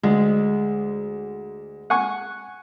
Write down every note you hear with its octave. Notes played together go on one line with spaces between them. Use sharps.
D2 G#3
F#5 G#5 C#6